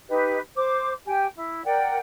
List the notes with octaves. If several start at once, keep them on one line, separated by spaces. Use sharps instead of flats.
D#4 G4 B4 D#5
C5 D6
G4 G5 G#5
E4
A#4 D5 F#5 G5